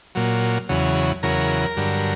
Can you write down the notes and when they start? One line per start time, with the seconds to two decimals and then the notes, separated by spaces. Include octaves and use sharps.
0.15 A#2 F#3
0.69 E2 C#3 F#3
1.23 E2 C#3 F#3 A#4
1.77 G2 D3 F#3